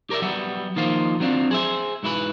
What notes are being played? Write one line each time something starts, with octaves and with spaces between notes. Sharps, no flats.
G4 A#4 C5 D5 E5
F#3 G3 B3 E5
D#3 F3 A#3 D#4 F4 C5
F#3 C4 D4 F4
G#4 C5 E5
G#2 F#3 E4 A4 B4